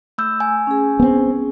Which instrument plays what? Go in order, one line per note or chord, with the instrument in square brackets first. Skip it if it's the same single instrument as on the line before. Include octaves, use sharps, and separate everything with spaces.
[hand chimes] A3 E6 G6
G#5
[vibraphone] C#4 G#4
[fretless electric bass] B3 C4